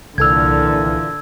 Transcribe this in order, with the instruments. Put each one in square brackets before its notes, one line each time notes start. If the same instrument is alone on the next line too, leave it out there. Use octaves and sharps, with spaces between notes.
[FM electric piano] C2 A4 F6 [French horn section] A#2 E3 [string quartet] D3 [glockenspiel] E6 G#6